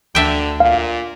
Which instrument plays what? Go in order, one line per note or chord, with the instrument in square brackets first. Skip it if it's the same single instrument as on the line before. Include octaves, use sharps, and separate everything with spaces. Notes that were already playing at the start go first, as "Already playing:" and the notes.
[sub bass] D2 [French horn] D3 [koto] D4 E5 G5
[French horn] A#2 [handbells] F5